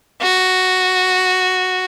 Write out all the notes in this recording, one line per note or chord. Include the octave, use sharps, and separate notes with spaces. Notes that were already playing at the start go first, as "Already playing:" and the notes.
F#4